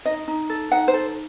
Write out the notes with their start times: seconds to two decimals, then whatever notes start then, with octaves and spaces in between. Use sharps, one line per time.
0.05 D#4 D#5
0.28 D#4
0.49 A4
0.72 D#4 F#5
0.88 C5
0.94 A4